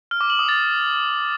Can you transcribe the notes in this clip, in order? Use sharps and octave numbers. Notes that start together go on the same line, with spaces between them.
F6
D6
F#7
D#6
A6